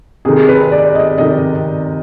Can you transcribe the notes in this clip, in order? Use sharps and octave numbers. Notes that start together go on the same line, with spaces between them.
C3 D#3 G#4
B4
D5
D#5
C3 D#3 D#5